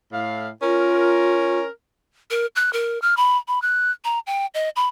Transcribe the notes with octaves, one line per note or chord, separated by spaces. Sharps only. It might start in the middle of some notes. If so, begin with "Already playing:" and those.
A2 F5
C#4 F4 A#4
A#4
F#6
A#4
F6
B5
B5
F#6
A#5
G5
D#5
B5